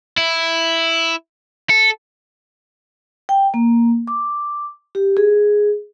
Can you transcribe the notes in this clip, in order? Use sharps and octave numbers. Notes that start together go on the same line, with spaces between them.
E4
A4
G5
A#3
D6
G4
G#4